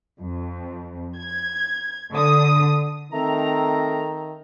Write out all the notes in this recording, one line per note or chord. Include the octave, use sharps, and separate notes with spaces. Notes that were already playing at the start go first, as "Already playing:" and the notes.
F2
G#6
D3 D#6
D#3 A3 C4 A#5